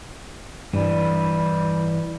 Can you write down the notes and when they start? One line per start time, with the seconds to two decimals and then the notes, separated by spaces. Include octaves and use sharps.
0.73 G2 E3 G3